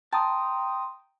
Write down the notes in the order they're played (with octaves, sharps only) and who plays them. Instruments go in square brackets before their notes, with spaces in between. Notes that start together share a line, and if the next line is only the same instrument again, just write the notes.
[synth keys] G5 A#5 D#6 [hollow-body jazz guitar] A5 [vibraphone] C6